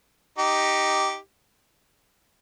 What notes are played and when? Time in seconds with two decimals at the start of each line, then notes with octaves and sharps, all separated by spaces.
0.38 D#4 G4